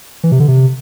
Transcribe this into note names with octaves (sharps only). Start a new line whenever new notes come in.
E3
C3
D3
C3